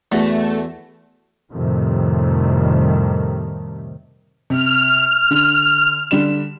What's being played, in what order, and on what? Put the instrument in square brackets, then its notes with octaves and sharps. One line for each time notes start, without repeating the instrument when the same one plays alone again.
[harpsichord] E2 F#4 [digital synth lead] A3
[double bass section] F2 A2 C3 D#3 G3 A3
[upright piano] C3 [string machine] F6
[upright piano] D3
D3 G3 E7